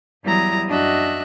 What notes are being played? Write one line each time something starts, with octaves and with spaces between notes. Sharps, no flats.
E2 F#3 G3 E4 A#5 D#6
F#2 D4 F#4 D#5 E5 F#6